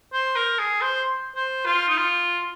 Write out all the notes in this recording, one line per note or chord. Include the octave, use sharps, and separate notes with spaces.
C5
A#4
G#4
C5
C5
F4
D#4
F4